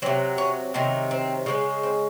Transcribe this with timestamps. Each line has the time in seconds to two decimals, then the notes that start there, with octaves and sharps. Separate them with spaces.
0.02 C3 F#3 C4
0.38 C#4
0.74 C3 D#3 F#3 C4
1.11 C4
1.46 C#3 F3 G#3
1.83 C4